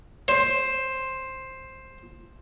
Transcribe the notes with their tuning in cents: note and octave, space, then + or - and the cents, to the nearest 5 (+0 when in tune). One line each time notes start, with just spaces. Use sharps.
C5 +10